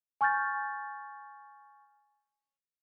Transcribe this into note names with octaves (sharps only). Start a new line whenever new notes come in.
G#5 C#6 F6 G6 A6